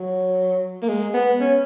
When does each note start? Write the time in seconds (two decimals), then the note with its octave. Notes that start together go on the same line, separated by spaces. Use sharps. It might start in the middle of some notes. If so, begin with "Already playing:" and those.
Already playing: F#3
0.83 A#3
0.89 G#3
1.14 B3
1.40 C#4